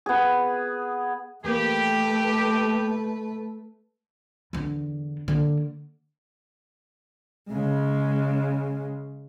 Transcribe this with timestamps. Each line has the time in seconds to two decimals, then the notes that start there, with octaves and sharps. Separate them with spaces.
0.06 B3 G#4
1.44 E2 A3 A#3 G4 B4
4.53 E2 D3
5.28 D3 A#3
7.50 C#3 G#3